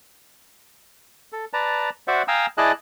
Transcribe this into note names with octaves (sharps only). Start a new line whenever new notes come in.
A4
B4 D5 A5 A#5
F#4 C5 D5 E5 F#5
F5 G5 G#5 A#5 D#6 E6
E4 G#4 D5 D#5 A5 F#6